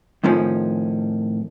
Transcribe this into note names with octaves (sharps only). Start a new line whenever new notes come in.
F2 A2 D#3 F3 C#4